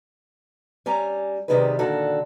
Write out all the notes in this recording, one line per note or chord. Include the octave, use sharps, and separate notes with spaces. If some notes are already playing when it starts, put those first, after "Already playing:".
G3 C#4 G#5 A#5
C3 D#3 G3 B3 G#4 B4
A#2 D3 D#3 F#4 A4